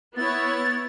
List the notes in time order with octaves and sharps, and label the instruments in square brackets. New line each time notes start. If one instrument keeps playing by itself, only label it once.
[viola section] B3 E4 C#5 [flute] A6